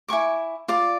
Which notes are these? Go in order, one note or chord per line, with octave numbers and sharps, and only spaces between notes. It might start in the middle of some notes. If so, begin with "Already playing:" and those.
E4 G#5 C#6 D6
F4 D5 D6